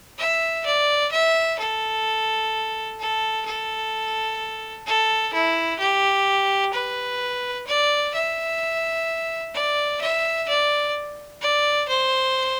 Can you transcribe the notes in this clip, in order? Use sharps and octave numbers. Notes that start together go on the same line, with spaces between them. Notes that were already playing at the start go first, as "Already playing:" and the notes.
E5
D5
E5
A4
A4
A4
A4
E4
G4
B4
D5
E5
D5
E5
D5
D5
C5